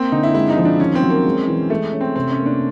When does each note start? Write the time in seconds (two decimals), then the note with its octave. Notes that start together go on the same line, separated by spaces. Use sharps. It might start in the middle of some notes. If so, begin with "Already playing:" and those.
Already playing: A#3 C4
0.12 D3 D#4
0.23 E4
0.34 G#3 E4
0.50 D#4
0.57 F3
0.65 D4
0.80 D#3 C#4
0.95 C4
1.02 F#3
1.10 A#3
1.25 G#3
1.47 E3
1.70 G#3 A3
1.93 C#4
2.01 C4
2.16 C3 C4
2.31 C#4
2.39 A#3
2.46 D4